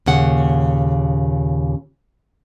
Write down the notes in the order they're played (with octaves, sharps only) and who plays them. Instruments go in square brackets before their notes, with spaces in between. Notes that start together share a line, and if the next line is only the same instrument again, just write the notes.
[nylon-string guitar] D#2 A#2 C#3 F#5